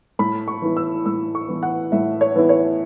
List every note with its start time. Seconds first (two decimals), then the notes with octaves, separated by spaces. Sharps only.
0.19 A2 B5
0.48 C#6
0.62 E3 B3 E4
0.77 E6
1.06 A2 E6
1.35 C#6
1.48 E3 B3 E4
1.63 F#5
1.92 A2 E5
2.21 C#5
2.36 E3 B3 E4
2.49 C#5